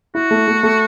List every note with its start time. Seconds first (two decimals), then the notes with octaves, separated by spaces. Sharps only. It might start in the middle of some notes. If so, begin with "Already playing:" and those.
0.15 E4 F#4
0.31 A3
0.48 A3
0.63 A3